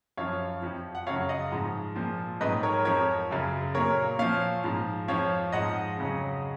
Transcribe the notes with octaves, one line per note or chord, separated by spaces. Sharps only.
F#2 F3 C#5 F5
F2 F3
F#5
F#2 C#3 F#3 C#5 F5
D#5 F#5
G#2 F3
A#2 F3
G#2 D#3 F#3 B4 D#5
A#4 C#5
F2 F3 A#4 C#5
F#2 C#3 F#3
A#2 F#3 A#4 C#5
A#2 F3 C#5 F5
G#2 F3
F2 F3 C#5 F5
G#2 F3 D#5 F#5
F2 C#3 F#3